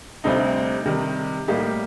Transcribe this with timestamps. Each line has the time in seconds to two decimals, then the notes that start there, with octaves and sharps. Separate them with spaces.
0.24 D2 C3 G3 C4 D#4
0.86 C3 D#3 G3
1.48 A2 G3 A#3 D#4 G4